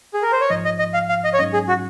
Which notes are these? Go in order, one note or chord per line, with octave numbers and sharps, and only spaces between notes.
G#4
A#4
C5
C#5
A#1 G#2 F3 D#5
D#5
D#5
F5
F5
D#5
C#5
A#1 G#2 F#3 C#4 D#5
G#4
F#4